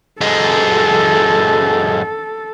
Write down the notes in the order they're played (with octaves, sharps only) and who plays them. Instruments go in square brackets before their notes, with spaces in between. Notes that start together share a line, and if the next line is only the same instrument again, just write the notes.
[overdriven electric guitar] F#2 G#3 [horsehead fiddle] A4